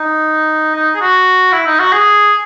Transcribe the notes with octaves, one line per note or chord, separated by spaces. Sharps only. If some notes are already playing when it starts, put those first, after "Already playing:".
Already playing: D#4
D#4
G#4
F#4
E4
D#4
F#4
G#4